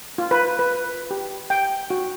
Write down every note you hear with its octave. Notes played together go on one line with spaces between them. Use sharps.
F4
B4
B4
G4
G5
F#4